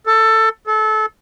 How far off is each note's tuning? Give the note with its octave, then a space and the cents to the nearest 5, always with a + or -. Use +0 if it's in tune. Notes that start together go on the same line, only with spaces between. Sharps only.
A4 +15
A4 -25